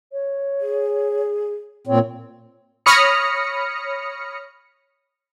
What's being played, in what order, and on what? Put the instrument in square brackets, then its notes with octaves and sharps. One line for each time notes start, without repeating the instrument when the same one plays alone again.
[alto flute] C#5
[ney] G#4
[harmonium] A#2 C4 [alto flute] C#5
[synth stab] C#5 B5 D#6 F6 A#6 C#7